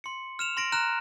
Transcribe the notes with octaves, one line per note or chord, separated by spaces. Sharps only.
C6 C#7
F6 E7 F7
C6 A#6 D7
A#5 F6 F#6 E7